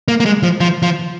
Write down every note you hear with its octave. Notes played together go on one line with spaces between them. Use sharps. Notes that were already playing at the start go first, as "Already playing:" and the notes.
A#3
A#3
G#3
F3
F3
F3